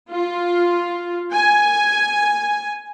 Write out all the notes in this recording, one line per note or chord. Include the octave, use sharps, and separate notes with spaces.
F4
G#5